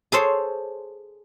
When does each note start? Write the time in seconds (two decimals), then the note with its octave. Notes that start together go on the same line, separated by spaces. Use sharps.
0.12 G#4 A4 C5 C#5